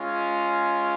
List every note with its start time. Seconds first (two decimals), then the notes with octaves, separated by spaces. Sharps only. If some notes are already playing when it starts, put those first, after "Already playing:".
Already playing: G#3 C#4 F4